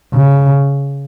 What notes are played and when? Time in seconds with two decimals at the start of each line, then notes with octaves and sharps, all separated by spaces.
0.14 C#3